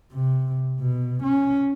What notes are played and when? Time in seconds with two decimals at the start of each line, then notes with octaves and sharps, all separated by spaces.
0.13 C3
0.80 B2
1.23 C#4